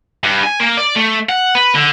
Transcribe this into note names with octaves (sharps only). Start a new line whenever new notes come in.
G2
G#5
A#3
D5
A3
F#5
B4
D3